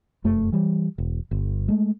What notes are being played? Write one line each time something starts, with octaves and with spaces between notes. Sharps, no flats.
F1 F#2 A3
E3 G3
E1
G1
G#3 A3